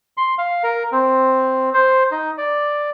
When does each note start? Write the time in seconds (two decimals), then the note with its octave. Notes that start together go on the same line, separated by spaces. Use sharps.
0.17 C6
0.38 F5
0.63 A#4
0.92 C4
1.74 C5
2.12 D#4
2.38 D5